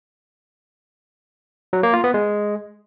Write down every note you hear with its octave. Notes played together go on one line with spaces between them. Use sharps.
F#3
A#3
F4
B3
G#3